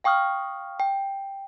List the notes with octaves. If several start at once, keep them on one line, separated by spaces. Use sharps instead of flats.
F5 G5 C#6 D#6 F6
G5